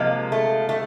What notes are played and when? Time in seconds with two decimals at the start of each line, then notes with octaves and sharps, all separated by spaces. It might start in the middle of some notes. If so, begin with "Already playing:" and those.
Already playing: C3 F3 G#3 A#3
0.32 A3
0.69 A3